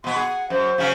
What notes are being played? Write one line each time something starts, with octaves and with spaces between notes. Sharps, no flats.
B2 B3 C6
G#4 F#5
F#2 C5
C#3 F#3 C#4